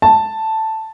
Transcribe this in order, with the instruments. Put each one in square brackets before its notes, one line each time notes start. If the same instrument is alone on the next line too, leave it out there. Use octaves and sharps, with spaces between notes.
[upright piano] A5